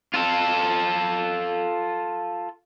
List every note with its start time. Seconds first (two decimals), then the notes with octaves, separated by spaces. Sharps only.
0.14 F4 A4